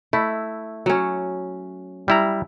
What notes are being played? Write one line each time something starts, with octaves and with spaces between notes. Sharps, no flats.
A3 E4
F#3 C#4
G3 E4 A#5